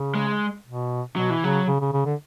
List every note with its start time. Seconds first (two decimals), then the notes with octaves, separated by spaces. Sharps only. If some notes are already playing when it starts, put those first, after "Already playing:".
Already playing: C#3
0.15 G#3
0.66 B2
1.16 B2 F#3
1.30 E3
1.42 C#3 F#3
1.67 C#3
1.80 C#3
1.92 C#3
2.05 D3